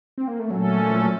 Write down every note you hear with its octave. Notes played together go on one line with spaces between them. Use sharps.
C4
A#3
A3
A#2 F#3 A3 C#4 A4
F3
F#3